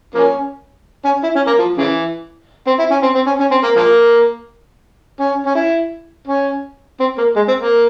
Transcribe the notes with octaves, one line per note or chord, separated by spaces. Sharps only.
F3 A#3 C#4
C#4
E4
C#4
A#3
F3
C#3 E3
C4
E4
C#4
C4
C4
C#4
C#4
C4
A#3
F3 A#3
C#4
C#4
E4
C#4
C4
A#3
G#3
C4
A#3